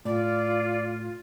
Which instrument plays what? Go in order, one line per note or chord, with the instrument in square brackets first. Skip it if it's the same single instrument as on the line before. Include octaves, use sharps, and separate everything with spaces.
[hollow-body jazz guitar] A2 [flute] F4 [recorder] D5